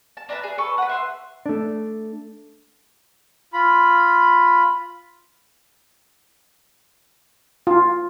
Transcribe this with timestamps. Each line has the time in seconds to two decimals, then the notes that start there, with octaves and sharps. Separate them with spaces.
0.17 A5
0.29 D4 A#4 B4 E5
0.43 G#4
0.58 A4 B4 C#6
0.78 B4 F#5
0.89 E5 C6
1.46 A3 D4
3.53 F4 B5
7.67 F4